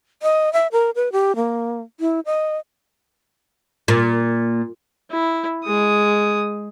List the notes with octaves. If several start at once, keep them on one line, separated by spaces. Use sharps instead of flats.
D#5
E5
A#4
B4
G4
A#3
E4
D#5
A#2
E4
G#3 D#6